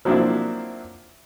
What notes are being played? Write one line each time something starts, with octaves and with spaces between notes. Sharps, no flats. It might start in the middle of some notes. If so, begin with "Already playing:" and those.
F3 F#3 A#3 C4 D4 E4